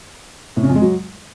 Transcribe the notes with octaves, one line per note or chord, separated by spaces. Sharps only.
A2
C#3
F2
G#3
F#3